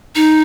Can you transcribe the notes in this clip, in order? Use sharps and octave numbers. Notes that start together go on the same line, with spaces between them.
D#4